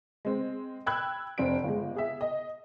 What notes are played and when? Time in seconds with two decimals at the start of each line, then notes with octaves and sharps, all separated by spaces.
0.25 G#3 C4
0.86 G5 B5 E6 F#6 G#6
1.38 F1 C4 D4 D7
1.64 G1 G#3
1.96 G#4 E5
2.21 D#5